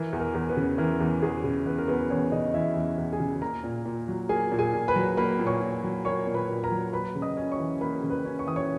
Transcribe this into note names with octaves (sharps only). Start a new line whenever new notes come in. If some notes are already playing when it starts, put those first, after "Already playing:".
Already playing: E3 A#4
E2
A#4
E2
B3 B4
C#3
E3 A#4
E2
E2 G#4
C#3
E3 B3 B4
A#4
E2 B3 B4
E2 C#4 C#5
C#3 D#4 D#5
E3 E4 E5
E2
E2
G#4 G#5
C#3
A#3 A#4 A#5
A#2
A#2
F#3
A#3 G#4 G#5
A#2
G#4 G#5
A#2
B4 B5
F#3
A#3 B4 B5
A#2
C#5 C#6
A#2
F#3
A#3 C#5 C#6
A#2
B4 B5
A#2
A#4 A#5
F#3
A#3 B4 B5
C#3
D#5 D#6
C#4
C#5 C#6
E3
A#3 B4 B5
C#3
B4 B5
C#4
C#6
E3 D#6
C#5 C#6